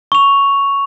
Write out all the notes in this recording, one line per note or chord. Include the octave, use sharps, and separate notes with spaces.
C#6 F7